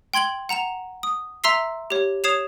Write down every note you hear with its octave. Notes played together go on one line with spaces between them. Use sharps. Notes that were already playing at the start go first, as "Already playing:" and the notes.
G5 C6 G#6 F#7 G7
F#5 A#5 E7 F7
D#6
E5 A#5 C6 E6 B6 C7
G4 C#5
C#5 D#6 G#6 C7 E7 F7